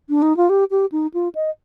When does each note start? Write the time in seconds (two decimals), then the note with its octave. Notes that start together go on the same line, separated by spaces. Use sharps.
0.09 D4
0.22 D#4
0.37 F4
0.49 G4
0.71 G4
0.92 D#4
1.14 F4
1.35 D#5